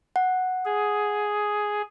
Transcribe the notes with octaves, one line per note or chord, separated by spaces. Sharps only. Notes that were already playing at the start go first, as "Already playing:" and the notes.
F#5
G#4